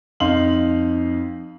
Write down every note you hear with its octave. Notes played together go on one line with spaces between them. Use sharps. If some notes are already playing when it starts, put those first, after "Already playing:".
F2 D#4 F5 C6 F#7